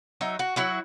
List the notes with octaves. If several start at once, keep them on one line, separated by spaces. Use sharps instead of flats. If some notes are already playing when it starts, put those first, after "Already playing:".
F#3 D#4 E5
F#4
F#3 E4 F#4